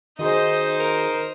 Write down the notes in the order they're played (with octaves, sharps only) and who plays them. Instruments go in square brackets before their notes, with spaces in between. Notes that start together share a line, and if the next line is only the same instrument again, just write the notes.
[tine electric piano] D#3 F#4 G#4 [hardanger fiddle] D#4 C5 [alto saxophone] D#5
[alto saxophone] A#4